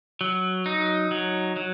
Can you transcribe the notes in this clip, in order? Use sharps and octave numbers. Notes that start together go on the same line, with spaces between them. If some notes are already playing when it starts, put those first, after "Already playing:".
F#3
D#4
F#3
F#3